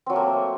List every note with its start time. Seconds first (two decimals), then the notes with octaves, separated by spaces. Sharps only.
0.06 C4
0.10 F#3
0.13 A3
0.16 A#3